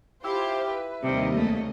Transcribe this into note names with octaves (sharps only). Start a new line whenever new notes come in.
E4 F4 G4 C5
B4
D#2 C3 D#3 G3 A#3 D#5
C#2 A3